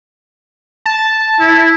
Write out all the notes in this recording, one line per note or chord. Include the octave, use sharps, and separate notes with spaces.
A5
E4